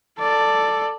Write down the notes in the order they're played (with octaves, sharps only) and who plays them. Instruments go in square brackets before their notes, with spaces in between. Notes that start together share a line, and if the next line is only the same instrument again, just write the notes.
[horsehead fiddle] A4 D5